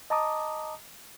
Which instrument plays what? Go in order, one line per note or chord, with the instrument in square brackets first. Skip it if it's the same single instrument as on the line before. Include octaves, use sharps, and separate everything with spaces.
[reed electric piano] D#5 A5 A#5 D6 D#6